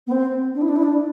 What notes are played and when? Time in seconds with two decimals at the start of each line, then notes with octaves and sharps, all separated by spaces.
0.07 B3
0.11 C4
0.54 D4
0.61 E4
0.68 D4
0.75 E4
0.82 D4